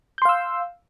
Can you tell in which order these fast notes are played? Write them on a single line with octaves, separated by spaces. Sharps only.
G6 C6 F5 E6